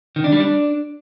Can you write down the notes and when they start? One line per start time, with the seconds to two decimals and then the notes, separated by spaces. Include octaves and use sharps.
0.16 D#3
0.24 D4
0.32 G3
0.40 D4